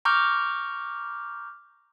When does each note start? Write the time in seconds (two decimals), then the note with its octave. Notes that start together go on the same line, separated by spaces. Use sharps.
0.05 A#5 C#6 D6 F6 G6